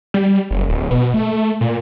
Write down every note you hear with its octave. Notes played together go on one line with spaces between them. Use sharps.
G3
F#1
D1
B2
A3
A#2